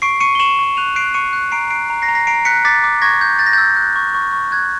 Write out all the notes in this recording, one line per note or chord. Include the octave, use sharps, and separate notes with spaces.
C#6 C7 D7
C#6 C#7 D#7
G7
C#6 E7 F#7
C#6
F#6 D#7 F7
F#6 C7 D7
C#6 C#7 D#7
F#6
A#5 C7 D7
F#6 C7 D7
A#5
A#6 C7
A#5
A#6 C7
A#5 C7 D7
F#6 B6 C#7
D6 A6 B6
D6
C#6 G#6 A#6
G6
G6 A6
A#6
E6 G6 A6
F#6
C#6
C#6
C#6
F#6 G#6